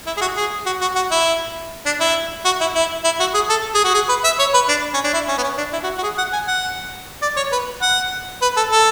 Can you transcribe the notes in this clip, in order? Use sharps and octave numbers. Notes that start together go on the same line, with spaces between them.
E4
G#4
F#4
G#4
F#4
F#4
F#4
E4
D4
E4
F#4
E4
E4
E4
F#4
G#4
A4
G#4
F#4
G#4
B4
E5
C#5
B4
D4
C#4
D4
E4
C#4
B3
C#4
D4
E4
F#4
F#4
G#4
F#5
G#5
F#5
D5
C#5
B4
F#5
B4
A4
A4